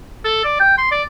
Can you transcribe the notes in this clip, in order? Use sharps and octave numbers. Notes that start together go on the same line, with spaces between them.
A4
D5
G5
C6
D5